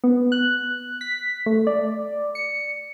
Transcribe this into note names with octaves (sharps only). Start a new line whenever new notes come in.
B3
F#6
B6
A3
D5
C#7